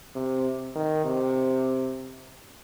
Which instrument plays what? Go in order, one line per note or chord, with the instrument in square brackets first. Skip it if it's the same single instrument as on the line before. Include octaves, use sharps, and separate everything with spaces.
[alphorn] C3
D#3
C3